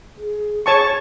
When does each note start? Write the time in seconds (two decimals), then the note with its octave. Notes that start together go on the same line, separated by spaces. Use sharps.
0.18 G#4
0.66 G#4 C#5 A5 C#6